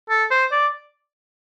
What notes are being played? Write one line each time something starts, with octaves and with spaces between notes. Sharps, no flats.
A4
C5
D5